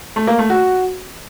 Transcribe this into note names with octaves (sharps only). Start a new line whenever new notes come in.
A3
A#3
A3
F#4